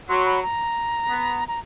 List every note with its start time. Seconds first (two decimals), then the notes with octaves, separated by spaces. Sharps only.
0.09 F#3 C6
0.25 B5
0.43 A#5
1.09 B3
1.48 A#5